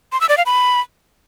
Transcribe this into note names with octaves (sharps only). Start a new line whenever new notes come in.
C6
E6
D5
F5
B5